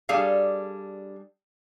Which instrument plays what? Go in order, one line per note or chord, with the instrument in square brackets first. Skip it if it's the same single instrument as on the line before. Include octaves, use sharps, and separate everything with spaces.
[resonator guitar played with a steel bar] G3 D4 G#4 A4 F5